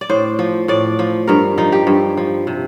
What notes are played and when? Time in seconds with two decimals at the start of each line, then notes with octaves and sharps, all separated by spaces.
0.01 D5
0.10 A2 C5
0.39 F3
0.68 A2 D5
0.99 F3
1.27 G2 A#4
1.58 F3 D#4
1.72 G4
1.87 G2
2.17 F3
2.47 C3